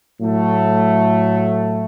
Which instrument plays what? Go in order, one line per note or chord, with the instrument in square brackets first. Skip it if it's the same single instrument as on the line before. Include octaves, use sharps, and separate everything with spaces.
[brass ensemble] A2 F#3 A3